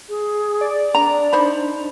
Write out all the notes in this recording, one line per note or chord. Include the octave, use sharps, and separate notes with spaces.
G#4
D5
D4 A#5
D#4 C5 B5